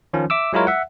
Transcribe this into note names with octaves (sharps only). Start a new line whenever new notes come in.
D#3 F3 C#4
E5 D6 E6
F#3 G#3 E4 F4 A#4 C#5
E5 F#5